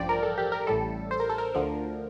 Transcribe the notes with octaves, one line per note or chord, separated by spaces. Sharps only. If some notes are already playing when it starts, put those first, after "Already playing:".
Already playing: A1 G2 F3 D5 G5
A#4
A4
G4
A#4
A1 A2 G3 A4
C5
A#4
A4
A#4
D2 D3 F3